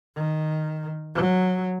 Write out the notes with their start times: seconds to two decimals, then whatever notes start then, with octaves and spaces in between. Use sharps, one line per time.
0.16 D#3
1.15 F#3